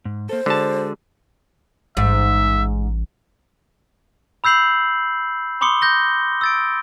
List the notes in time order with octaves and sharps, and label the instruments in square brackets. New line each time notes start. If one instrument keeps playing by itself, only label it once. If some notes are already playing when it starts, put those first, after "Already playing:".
[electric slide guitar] G#2
[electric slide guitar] A#3 A4 [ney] C5
[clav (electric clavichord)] D3 A5 [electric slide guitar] G#3 F#4 G#4
[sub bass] A1 [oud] G#2 [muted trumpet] E5
[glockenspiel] B5 E6 G6 C7 F#7
B5 C6 D6 D#6 C#7 G7
G6 A#6 G7
E6 A6 D7